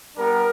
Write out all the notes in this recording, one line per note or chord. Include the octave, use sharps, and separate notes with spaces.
G3 B3 D4 A#4